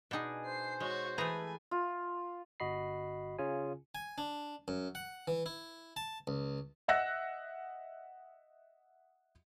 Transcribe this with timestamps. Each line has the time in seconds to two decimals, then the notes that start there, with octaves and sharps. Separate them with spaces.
0.11 B2 D4 D#4 G4 G#4
0.46 C5 C7
0.80 G#3 F#4 C#5
1.18 E3 A3 G#4 B4 G#5 A#5
1.71 F4
2.60 G1 F#4 D#5 B5 C7
3.39 C#3 C#4 F4 G#4 G#5
3.95 G#5
4.18 D4
4.68 F#2
4.95 F#5
5.28 E3
5.46 E4
5.96 A5
6.27 C#2
6.88 D#5 E5 F#5 E6 F#6 A#6